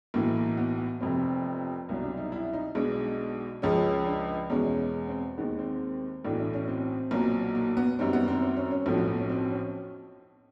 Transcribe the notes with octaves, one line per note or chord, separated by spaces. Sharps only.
B1 A2 E3 A#3
A#3
B3
F1 F2 C3 C4
C2 B2 F#3
D4
D#4
E4
D#4
B1 B2 G#3 D4
C#2 C#3 F3 G#3 C#4
D4
E2 B2 G#3 C#4
C4
D#2 D#3 G#3 B3
C4
B1 A2 E3 A3 D4
D4
C#4
C4
B1 A#2 F#3 A#3
A#3
B3
F#2 D#3 G3 C4
B3
C4
C4
C#4
C#4
B1 A2 F3 A3 C4
B3
B3
C#4
C4
C#4